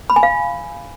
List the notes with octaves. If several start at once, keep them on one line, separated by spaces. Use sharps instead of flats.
B5
G#5
F5